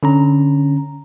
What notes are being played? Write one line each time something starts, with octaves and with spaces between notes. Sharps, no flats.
D3 C#4 A#5